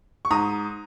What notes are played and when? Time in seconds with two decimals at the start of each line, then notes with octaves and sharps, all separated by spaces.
0.25 C#6
0.31 G#2 A#5 D#6